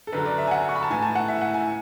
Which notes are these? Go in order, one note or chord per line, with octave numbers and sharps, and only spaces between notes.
A4
F#2 D3 F#3 B4
D5
E5
G#5
F#5
C#6
B5
A5
A2 E3 G#5
A5
F#5
E5
F#5
G#5